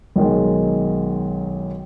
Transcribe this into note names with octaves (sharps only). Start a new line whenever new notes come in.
B1 D#3 G#3